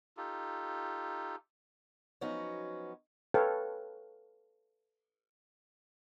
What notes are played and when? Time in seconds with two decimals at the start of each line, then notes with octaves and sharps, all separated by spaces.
0.17 D#4 F4 G4 A4
2.21 F3 F#3 B3 C#4 D#4 F#4
3.34 A4 B4 C#5 F5 G5